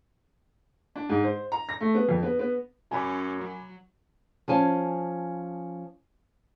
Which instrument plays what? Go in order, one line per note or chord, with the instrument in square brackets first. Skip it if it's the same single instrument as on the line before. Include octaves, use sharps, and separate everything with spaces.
[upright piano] D4
G#2
C5
A#5
A#6
A3
B3
F2
B3
B3
[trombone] F#2 [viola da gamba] C#4 [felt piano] G#5 B5 D6
[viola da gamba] F#3
[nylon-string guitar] F3 C#4 G#5 A5